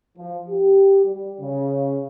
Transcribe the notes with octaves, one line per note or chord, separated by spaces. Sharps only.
F3
G4
G3
C#3